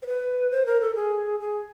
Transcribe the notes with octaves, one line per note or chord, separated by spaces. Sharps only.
C5
B4
C5
A#4
A4
G#4
G#4